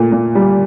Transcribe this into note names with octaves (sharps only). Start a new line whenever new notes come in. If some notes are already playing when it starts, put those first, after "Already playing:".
Already playing: A#2 A3
A#2
G3